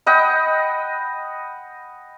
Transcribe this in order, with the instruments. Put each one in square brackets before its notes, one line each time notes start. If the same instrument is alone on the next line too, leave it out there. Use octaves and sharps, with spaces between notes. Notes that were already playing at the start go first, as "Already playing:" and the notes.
[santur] D#5 F#5 G5 B5